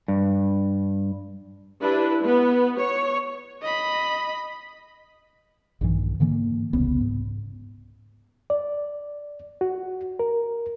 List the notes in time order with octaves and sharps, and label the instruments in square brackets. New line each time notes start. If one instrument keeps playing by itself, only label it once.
[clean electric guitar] G2
[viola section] D4 E4 G4 B4
B3 B4
C#5
[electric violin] D#5 B5
[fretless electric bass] A#1 G2 D#3 E3
G#2 D3 E3 A#3
D#1 C2 C#3 B3
G#2
[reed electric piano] D5
F#4
A#4